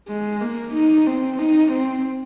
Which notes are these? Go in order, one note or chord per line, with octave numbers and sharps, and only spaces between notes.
G#3
A#3
D#4
C4
D#4
C4